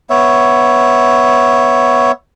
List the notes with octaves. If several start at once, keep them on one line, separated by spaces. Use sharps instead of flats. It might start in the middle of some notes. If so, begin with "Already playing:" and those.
B3 C#5 E5